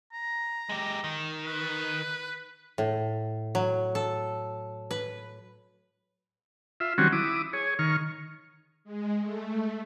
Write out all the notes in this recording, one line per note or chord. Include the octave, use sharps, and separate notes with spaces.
A#5
G#3 G4
D#3
B4
A2
F#3
A4
B4
F4 E5
D#3 F#3 G3 C4 C#4 F#4
E4 D6 D#6
G#4 C#5
D#3 C#6 F6
G#3
A3